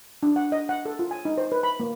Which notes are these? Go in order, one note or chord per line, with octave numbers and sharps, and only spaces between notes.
D4
F#5
D#5
F#5
A4
F4
G#5
D#4
C5
B4
B5
A#3